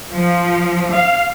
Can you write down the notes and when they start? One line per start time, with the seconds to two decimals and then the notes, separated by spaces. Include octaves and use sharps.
0.13 F3
0.93 F5